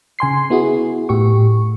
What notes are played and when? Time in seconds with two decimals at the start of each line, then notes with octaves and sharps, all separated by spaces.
0.19 C#3 G#5 C6 C7
0.50 B3 E4 F#4 G#4
1.09 A2 G4 C#6